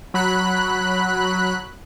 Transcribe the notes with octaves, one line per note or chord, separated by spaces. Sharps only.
F#3 B5 F#6